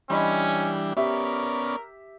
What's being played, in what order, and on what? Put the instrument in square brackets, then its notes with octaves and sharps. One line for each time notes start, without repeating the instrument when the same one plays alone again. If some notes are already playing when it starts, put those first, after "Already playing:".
[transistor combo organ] E3 G3 D4 [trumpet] C#4 [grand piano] D#5 B5 C6
[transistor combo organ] B3 C#4 D5 [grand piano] G4 E5 [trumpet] A#4